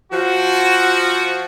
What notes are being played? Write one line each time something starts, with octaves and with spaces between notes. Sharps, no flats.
F3 F#4